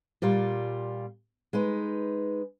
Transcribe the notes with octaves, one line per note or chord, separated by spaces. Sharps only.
A#2 G3 F4
G#3 D#4 B4